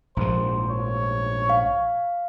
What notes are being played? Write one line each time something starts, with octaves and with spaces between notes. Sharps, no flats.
A#1 G#2 F3 C5
C#5
F5